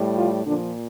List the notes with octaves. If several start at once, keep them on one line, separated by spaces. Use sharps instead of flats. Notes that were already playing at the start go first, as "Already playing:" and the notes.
Already playing: A2 G3
F3 F4
A#2 D3 F3 D4